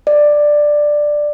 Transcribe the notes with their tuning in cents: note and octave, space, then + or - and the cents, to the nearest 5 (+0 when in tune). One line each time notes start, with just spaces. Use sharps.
D5 +10